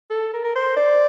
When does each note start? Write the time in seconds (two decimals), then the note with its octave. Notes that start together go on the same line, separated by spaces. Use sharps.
0.10 A4
0.34 A#4
0.44 A#4
0.55 C5
0.77 D5